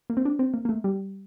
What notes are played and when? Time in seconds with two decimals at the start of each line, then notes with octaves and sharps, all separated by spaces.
0.10 A#3
0.17 C4
0.25 D4
0.39 C4
0.54 A#3
0.65 A#3
0.69 A3
0.84 G3